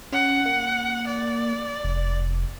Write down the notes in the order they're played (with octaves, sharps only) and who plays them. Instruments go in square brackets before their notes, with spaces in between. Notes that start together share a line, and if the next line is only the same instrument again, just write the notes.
[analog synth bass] C#4 [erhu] F#5
[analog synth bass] A#3
[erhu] D5
[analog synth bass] F1